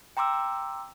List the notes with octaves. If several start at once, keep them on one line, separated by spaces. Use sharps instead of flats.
G5 A#5 C6 D6 E6